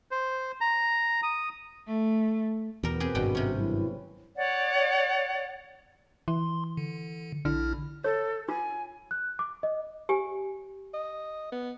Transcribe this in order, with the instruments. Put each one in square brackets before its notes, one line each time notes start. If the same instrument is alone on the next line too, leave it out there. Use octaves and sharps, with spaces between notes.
[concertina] C5
A#5
D#6
[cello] A3
[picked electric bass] E2 [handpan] B2 B3 [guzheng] G3 A#4
[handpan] C4 B4 [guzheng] G4 G#4
[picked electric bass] G#1 G2 [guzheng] B2 G3 G5 [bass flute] F#4
[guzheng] C3 C#4
[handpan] F#3 A#3 [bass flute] E4
[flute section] C#5 D5 F#5
[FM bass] E3 [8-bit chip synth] C6
[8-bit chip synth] D3
[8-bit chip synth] A#1 E4 F6 [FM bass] D3
[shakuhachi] A4 [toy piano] C#5
[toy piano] F4 [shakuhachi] G#5
[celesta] F#6
D6
D#5
[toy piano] G4 G#5
[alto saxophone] D#5
B3